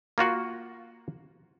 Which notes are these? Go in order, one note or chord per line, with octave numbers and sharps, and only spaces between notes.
A#3 F4 F#4 F#5